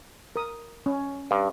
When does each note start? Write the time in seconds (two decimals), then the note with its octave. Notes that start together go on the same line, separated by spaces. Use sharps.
0.36 A#4 D#6
0.86 C#4
1.31 G2